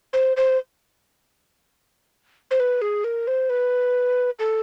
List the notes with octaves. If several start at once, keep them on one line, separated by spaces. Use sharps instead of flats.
C5
C5
C5
B4
G#4
A#4
C5
B4
A4